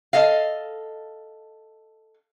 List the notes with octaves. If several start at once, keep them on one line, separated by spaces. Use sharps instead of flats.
A4 D#5 F5